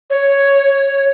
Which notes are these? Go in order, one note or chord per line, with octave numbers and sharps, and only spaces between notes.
C#5